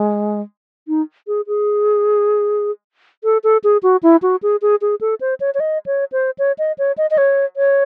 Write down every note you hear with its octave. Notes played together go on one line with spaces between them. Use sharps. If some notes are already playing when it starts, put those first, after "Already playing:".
Already playing: G#3
D#4
G#4
G#4
A4
A4
G#4
F#4
E4
F#4
G#4
G#4
G#4
A4
C5
C#5
C#5
D#5
C#5
C5
C#5
D#5
C#5
D#5
D#5
C#5
C#5